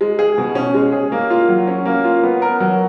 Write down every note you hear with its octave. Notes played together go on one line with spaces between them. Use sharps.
G#3
G#4
B2
C#4
G#3
G#4
A#3
F4
F#3
C#4
A#3
F4
B3
A#4
F#3